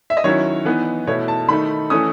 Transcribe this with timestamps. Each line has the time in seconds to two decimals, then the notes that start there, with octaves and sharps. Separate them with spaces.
0.10 E5
0.17 D#5
0.24 D#3 F#3 C#4 E4 C#5
0.65 E3 B3 D#4
1.07 B2 A3 E4 C#5
1.28 A5
1.49 D#3 A3 D#4 B5
1.90 E3 A3 C#4 D#6